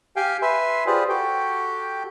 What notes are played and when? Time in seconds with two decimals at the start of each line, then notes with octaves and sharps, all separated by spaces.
0.16 G4 F5 G5 G#5
0.42 B4 E5 G#5 C6
0.87 F4 G4 G#4 B4 C5 D5
1.09 F#4 G4 A4 G5